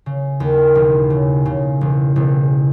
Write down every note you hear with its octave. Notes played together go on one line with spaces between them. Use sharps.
C#3
D#2
E1
C#3
C#3
E1
E1